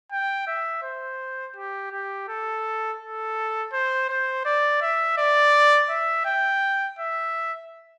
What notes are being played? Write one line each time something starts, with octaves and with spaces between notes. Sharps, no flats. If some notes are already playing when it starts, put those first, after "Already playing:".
G5
E5
C5
G4
G4
A4
A4
C5
C5
D5
E5
D5
E5
G5
E5